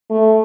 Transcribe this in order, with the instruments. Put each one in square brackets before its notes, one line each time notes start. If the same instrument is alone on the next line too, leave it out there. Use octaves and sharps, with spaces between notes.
[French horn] A3